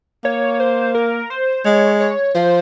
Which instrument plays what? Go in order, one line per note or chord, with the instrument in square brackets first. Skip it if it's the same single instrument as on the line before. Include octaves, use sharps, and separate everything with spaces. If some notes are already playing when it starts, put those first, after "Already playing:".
[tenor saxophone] A#3 [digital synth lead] C#5
[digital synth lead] C5
A#4
C5
[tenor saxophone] G#3 [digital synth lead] C#5
[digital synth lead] C#5
[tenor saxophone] F3 [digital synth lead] C5